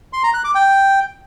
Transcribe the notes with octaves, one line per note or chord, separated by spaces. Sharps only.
C6
A#5
F#6
D6
G5